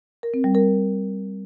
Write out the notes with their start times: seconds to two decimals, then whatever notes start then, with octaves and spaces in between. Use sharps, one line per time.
0.23 A#4
0.34 C4
0.44 G3
0.55 A#4